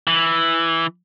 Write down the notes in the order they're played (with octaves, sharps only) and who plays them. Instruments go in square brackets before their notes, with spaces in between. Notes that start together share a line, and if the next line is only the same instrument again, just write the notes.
[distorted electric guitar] E3